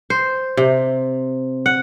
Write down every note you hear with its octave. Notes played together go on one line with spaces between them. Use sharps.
C5
C3
F#5